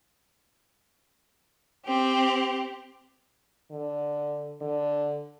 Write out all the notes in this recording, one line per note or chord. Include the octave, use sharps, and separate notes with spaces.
C4 G4
D3
D3